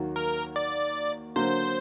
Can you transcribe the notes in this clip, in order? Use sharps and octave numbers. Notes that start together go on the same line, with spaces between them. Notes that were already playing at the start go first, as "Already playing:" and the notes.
Already playing: D#2 D#3 F#3 A#3 F#4
A#4
D5
D3 F#3 A#3 C5